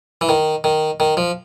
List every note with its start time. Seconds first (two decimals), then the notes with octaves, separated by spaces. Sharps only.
0.21 E3
0.29 D#3
0.64 D#3
1.00 D#3
1.17 F3